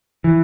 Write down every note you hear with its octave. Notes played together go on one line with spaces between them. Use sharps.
E3